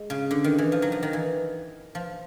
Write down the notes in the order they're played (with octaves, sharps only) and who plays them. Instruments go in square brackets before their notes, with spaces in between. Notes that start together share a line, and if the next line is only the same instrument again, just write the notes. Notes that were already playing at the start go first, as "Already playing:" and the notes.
Already playing: [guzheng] G#3
C#3
D3
D#3
E3
F3
F#3
F3
D#3
E3
F3